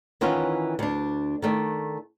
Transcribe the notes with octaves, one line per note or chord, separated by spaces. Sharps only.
D#3 E3 C#4 F4 F#5
D2 D4
D#3 A3 D5